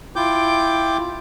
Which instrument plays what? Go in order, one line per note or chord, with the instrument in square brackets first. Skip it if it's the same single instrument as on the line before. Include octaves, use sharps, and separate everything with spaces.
[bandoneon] E4 F4 G5 D6 G6